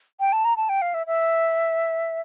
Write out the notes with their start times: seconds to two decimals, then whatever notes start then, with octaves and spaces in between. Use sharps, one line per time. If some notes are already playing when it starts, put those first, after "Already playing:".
0.20 G5
0.32 A5
0.45 A#5
0.57 A5
0.69 G5
0.82 F5
0.94 E5
1.07 E5